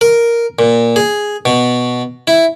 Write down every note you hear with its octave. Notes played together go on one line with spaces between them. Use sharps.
A#4
A#2
G#4
B2
E4